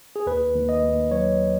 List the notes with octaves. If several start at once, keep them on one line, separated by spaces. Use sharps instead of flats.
G#4
D#2 B4
D#2
D#5
D#2
F#3 C#5